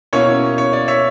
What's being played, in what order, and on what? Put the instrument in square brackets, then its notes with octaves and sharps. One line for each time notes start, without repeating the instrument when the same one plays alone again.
[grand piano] B2 A#3 C#4 E4 C#5
C#5
D5
C#5 E5